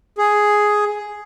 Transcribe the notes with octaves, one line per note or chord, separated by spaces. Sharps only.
G#4